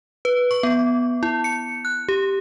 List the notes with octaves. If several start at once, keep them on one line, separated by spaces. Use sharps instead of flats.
B4
C#6
B3
E4
C#7
F#6
G4